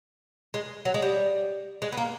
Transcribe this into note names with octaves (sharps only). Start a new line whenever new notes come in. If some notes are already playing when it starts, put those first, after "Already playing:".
G#3
F#3
G#3
G3
G#3
B3
A#3